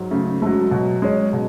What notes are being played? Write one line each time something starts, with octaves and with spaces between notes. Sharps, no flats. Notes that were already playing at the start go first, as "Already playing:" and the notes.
Already playing: G#2 F#3
C#3 A3
F#3 G#3 A3
B2 F#3
G#3 C#4
B2